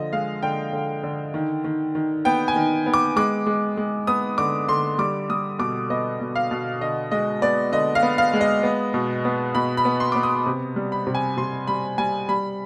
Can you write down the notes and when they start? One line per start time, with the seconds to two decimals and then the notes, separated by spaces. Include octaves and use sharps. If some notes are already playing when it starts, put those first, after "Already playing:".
Already playing: D3 F3 D#5
0.13 G#3 F5
0.43 D3 G5
0.73 D3
1.03 D3
1.34 D#3
1.64 D#3
1.95 D#3
2.25 B3 G5
2.48 G#5
2.56 D#3
2.86 B3
2.94 D6
3.16 G#3 D6
3.47 G#3
3.77 G#3
4.07 B3 D#6
4.38 D3 D6
4.68 D3 C6
4.98 G3 D6
5.30 G3 D#6
5.59 B2 D6
5.90 B3 D#5
6.20 B2
6.36 F5
6.51 B2
6.81 D3 D#5
7.11 G#3 D#5
7.42 B3 D5
7.72 D3 D#5
7.95 F5
8.03 B3
8.18 F5
8.33 G#3
8.41 D#5
8.63 B3
8.94 B2
9.25 B3
9.55 B2 B5
9.77 B5
9.85 B3
10.00 C6
10.12 B3 D6
10.23 D#6
10.46 C3
10.76 G3
10.92 B5
11.07 C3
11.15 G#5
11.37 C3 C6
11.67 G3 B5
11.98 G3 G#5
12.29 G3 B5